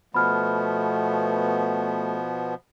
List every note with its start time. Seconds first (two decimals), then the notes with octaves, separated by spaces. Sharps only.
0.14 B2 F3 A3 B3 B5 F6